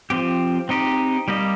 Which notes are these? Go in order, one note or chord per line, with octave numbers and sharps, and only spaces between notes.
F3 C4 G4
C4 D#4 G4 D#5
G3 A#3 G4 D#5